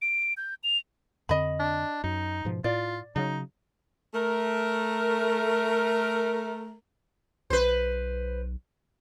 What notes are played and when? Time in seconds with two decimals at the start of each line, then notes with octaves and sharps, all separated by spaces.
0.02 D7
0.37 G6
0.64 F7
1.29 F2 D3 C4 D#5 B5
1.60 D4
2.04 F#2 D#4
2.45 G#2 B2 F3
2.64 A2 F4 D5
3.16 C#3 F#3 D#4
4.14 A3 A#4
7.50 B1 B4 C5